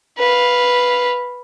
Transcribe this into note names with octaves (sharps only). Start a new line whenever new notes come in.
B4 F5